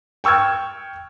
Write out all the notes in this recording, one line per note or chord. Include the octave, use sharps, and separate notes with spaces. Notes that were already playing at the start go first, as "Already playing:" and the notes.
G5 C#6 E6 F6 G#6